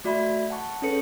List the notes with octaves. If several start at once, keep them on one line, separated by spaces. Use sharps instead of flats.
A3 F#4 D5 E5 B5
F#5 A5 C#6
C#4 G#4 A4 B4 C#5 C#7